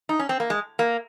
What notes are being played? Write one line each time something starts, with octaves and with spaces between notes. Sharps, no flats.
D#4
C#4
C4
A#3
G#3
A#3